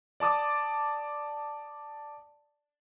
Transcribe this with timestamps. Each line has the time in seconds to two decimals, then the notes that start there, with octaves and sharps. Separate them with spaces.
0.20 D5 A5 D6 D#6